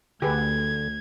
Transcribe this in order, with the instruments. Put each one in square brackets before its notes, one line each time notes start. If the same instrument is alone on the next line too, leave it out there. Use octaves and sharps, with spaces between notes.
[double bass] D2 [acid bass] D3 [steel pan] G4 G#4 B4 [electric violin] G#6